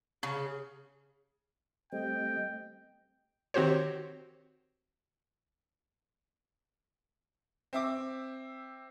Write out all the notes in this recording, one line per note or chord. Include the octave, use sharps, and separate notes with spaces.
C#3
G3 A3 C4 D#5 G5
D#3 C4 F#4 G4 C5 C#5
C4 E5 D6